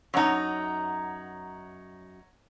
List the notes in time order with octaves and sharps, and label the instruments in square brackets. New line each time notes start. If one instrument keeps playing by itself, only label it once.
[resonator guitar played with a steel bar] F#2 D#4 [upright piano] C#5 F#5 A#5